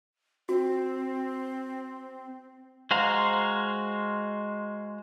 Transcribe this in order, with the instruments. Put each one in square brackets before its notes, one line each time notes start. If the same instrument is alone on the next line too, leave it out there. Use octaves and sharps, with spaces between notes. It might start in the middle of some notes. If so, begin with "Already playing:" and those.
[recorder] C4 [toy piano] F#4
[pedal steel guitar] G#3 F#4 C5 F5 A#5